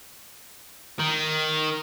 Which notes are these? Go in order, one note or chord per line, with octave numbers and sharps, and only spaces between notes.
D#3